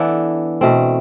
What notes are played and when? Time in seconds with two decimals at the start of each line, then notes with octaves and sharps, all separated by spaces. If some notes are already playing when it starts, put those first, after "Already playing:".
Already playing: E3 B3 D4 A4
0.61 B2 A3 C4